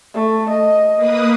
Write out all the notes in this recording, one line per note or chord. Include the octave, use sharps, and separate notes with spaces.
A3
D#5
A#3 B4 D#6